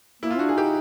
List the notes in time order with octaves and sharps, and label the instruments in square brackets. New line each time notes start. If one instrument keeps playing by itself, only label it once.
[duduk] A#3 [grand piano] E4
[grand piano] F4
[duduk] D4 [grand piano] F#4
[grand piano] G#4
[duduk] D#4 [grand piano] G4